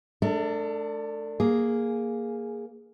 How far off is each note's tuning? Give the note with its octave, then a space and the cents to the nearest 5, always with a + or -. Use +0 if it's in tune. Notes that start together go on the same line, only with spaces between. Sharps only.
A3 -35 D4 +0 A4 +45
A#3 +0 G#4 +0